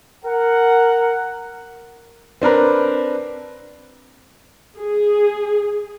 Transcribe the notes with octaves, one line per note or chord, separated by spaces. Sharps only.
A#4 F#5
C4 D4 A#4 B4
G#4